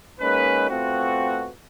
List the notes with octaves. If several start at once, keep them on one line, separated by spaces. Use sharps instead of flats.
G#3 A#3 C#4 D#4 B4
B2 A3 C4 F4 F#4